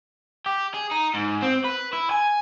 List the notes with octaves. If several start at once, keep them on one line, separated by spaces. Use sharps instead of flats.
G4
G#4
D#4
G#2
C4
B4
E4
G#5